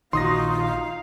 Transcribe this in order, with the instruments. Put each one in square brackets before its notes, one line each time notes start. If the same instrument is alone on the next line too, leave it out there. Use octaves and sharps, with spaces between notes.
[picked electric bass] A#1 D#3 [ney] D#4 [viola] F4 F#4 [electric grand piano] C6 D#6 A#6
[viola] F5